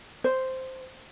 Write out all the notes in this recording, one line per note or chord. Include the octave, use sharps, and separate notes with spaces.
C5